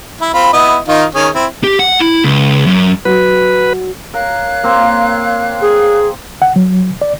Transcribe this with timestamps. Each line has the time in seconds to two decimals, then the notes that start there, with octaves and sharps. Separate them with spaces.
0.21 E4
0.34 C4 F4 B5
0.53 B3 E4 D#5
0.88 D#3 D#4 F4
1.15 D#3 C#4 G#4
1.35 C4 E4
1.64 G4
1.79 F#5
2.00 E4
2.24 C#2
2.67 F#2
3.05 F#3 B4
4.14 A#4 C#5 F5 F#6
4.63 A#3 C4 C5
5.61 G#4
6.42 F#5
6.56 F#3
7.02 D5